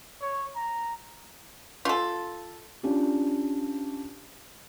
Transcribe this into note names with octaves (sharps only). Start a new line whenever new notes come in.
C#5
A#5
F4 A4
C#4 D4 F4 G4